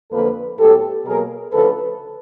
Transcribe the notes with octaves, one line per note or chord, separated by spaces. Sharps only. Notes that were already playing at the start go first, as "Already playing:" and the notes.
F2 D3 F3 A#3 A4 B4
A2 F#3 B3 G4 A4
B2 F#3 A#3 G#4 A#4
D2 C#3 F3 A4 B4